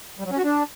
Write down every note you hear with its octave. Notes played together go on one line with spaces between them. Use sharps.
G3
F#3
C#4
F#4
D4